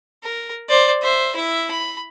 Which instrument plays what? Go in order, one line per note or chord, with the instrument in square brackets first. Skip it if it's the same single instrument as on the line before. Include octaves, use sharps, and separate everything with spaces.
[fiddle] A#4
C5 D5
C5 E5
E4 E5
B5